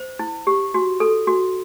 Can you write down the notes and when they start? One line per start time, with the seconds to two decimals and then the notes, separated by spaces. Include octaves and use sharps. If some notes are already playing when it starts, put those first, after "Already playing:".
Already playing: C5
0.19 E4
0.47 G4
0.74 F#4
1.00 A4
1.27 F#4